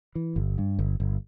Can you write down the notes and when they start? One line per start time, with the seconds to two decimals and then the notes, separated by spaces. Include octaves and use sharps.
0.15 E3
0.36 G1
0.58 G2
0.79 G1
1.00 G1